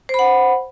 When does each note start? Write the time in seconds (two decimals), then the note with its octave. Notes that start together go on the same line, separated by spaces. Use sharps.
0.09 C5
0.14 B5
0.19 F#5